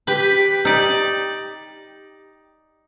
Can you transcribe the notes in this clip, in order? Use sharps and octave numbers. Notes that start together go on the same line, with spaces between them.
G4 B4
D#4 D5